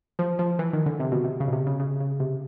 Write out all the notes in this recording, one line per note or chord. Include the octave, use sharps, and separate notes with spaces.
F3
F3
E3
D#3
D3
C3
B2
C3
C#3
B2
C3
C#3
C#3
C#3
C3